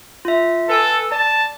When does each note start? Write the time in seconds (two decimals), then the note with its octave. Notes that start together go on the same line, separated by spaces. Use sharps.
0.25 F4 E5
0.69 A4 B4 G#5 E6
1.12 D5 A5